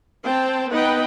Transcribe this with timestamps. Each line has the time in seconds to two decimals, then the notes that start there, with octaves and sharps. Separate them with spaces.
0.24 C4 C5 G5 A5
0.70 B3 D#4 B4 D#5 F#5 G5